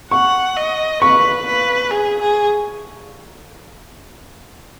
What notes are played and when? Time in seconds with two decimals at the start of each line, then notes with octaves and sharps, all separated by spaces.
0.11 F#5 C#6
0.56 D#5
1.02 B4 C#6
1.47 B4
1.91 G#4
2.21 G#4